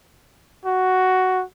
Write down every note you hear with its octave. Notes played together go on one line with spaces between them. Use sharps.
F#4